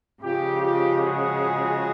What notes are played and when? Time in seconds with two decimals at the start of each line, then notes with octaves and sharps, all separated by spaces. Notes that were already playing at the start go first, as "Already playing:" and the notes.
0.23 C#3 F3 G#3 F4 G4
0.61 F4 G4
0.99 F#4 G#4